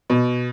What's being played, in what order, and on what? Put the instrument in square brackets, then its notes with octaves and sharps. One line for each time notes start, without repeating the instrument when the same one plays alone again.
[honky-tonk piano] B2